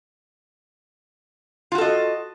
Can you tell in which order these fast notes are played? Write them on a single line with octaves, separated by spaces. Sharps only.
F4 F#4 A4 D#5